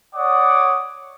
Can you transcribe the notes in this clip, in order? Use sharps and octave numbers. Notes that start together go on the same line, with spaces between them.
C#5 D5 F#5 D6 D#6